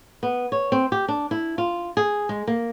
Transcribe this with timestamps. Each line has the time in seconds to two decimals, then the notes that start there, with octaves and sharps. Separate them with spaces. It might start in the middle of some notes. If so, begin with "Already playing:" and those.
0.23 B3
0.52 C#5
0.72 C4
0.92 G4
1.08 D4
1.31 E4
1.58 F4
1.97 G#4
2.29 G#3
2.47 A#3